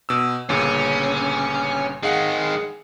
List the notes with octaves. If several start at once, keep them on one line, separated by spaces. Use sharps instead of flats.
B2 E6
G1 A#2 C#3 C#4
D#3 G#3 G#4 F5 F#5